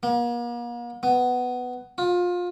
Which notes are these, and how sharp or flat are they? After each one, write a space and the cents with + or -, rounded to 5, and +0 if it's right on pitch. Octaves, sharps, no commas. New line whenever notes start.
A#3 +40
B3 +10
F4 +25